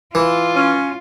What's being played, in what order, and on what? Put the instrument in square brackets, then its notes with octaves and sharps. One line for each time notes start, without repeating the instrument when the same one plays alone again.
[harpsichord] E3 [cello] F4
[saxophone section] C#4